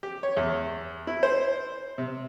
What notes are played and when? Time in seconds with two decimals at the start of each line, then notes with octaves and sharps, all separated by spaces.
0.03 G4
0.23 C#5
0.37 E2
1.07 E4
1.23 C5
1.98 C3